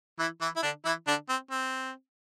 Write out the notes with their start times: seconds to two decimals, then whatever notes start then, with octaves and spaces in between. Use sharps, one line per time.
0.19 E3 E4
0.41 E3 E4
0.56 E4
0.63 D3 D4
0.85 E3 E4
1.07 D3 D4
1.29 C4
1.51 C4